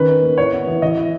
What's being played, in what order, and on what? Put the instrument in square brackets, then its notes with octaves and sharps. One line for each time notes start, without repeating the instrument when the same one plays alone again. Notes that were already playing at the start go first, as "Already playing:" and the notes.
Already playing: [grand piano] D#3 C#4 B4
D#4
A#3
E4 C#5
B3
E3
E3 D#5
E4